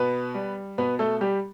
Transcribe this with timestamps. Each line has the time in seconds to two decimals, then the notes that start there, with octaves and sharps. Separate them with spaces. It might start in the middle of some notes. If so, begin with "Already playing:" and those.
Already playing: B2 B3 B4
0.34 G3
0.78 B2 B3 B4
0.99 A3 A4
1.21 G3 G4